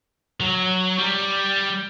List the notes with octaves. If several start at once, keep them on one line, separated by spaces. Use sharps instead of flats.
F#3
G3